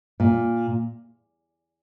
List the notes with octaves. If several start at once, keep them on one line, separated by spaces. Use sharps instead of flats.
A#2